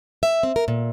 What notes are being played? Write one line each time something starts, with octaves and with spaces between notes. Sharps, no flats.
E5
C4
A#4
A#2